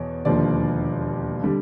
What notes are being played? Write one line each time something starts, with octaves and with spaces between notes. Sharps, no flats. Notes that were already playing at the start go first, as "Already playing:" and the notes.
Already playing: E2 B2 C#5
E1 D#2 D3 F3 D5
D3 G3